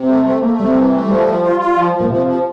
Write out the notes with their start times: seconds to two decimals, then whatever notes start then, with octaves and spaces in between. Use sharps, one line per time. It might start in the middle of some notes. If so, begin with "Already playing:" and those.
Already playing: C3
0.09 G3 A3
0.25 A3 C4
0.42 A3 A#3
0.59 C3 G3
0.76 E3
0.93 A3
1.09 F3 G3
1.27 F3
1.43 F4
1.60 F4
1.77 F3
1.93 F3
2.00 A#2
2.10 C3 F3
2.26 F3